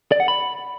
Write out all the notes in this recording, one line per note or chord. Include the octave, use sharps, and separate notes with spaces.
D5
F#5
B5